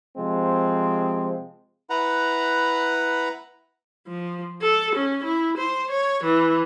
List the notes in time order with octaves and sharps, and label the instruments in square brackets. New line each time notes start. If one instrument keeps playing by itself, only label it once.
[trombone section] C3 F3 G#3 C4
[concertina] E4 B4 F#5 A#5
[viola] F3
A4
C#4
E4
C5
C#5
E3